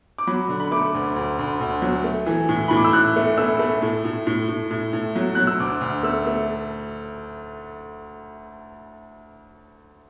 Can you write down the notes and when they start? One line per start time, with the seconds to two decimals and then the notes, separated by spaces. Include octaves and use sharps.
0.18 D6
0.27 F#3 B5
0.49 D3
0.60 B5
0.71 A3 D6
0.94 D2
1.16 D2
1.39 D2
1.61 D2
1.82 F#3
2.04 A3
2.26 E3
2.49 A2
2.68 A2 B5
2.77 D6
2.85 E6
2.93 A2 F#6
3.16 A3
3.38 A3 E6
3.59 A3
3.82 A2
4.05 A2
4.27 A2
4.48 A2
4.71 A2
4.93 A2
5.16 F#3
5.35 F#3 F#6
5.47 E6
5.60 D2 D6
5.81 D2
6.03 A3 E6
6.27 A3